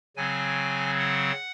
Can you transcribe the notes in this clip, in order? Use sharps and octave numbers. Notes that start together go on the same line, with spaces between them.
C#3 F#3 C4 G#5
F#5